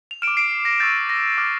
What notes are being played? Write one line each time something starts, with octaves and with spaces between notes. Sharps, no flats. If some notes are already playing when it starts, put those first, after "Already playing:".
F7
F6 D7 E7
D6
C7 D7
C7
A#6
C#6 E6 G6 A6
A#6
D6 F6